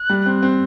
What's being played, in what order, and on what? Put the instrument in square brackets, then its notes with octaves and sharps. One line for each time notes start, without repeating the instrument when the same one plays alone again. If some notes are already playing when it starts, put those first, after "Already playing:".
Already playing: [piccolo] F#6
[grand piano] G3
C4
C4